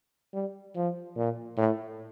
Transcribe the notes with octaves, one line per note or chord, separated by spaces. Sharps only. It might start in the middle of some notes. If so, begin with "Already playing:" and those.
G3
F3
A#2
A2